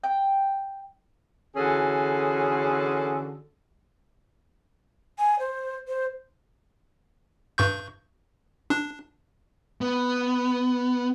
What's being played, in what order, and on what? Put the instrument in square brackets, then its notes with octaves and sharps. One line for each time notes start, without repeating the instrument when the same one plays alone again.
[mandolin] G5
[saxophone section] D3 E3 C#4 F#4 G#4 A4
[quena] G#5
C5
C5
[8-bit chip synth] G2 C#6 G6
D4
[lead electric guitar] B3